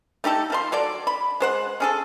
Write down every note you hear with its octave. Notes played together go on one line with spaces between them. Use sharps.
A3 D#4 G4 A4
F3 A4 C6
F#3 A4 D5
B5
G#3 C5 F#5
C#4 G#4 A4